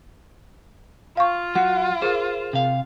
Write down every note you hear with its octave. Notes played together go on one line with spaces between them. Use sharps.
F4 F5 C#6
F#3 F#4 F#5
G#4 A#4 C5
C3 F5